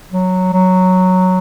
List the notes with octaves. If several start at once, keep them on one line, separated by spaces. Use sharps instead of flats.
F#3
F#3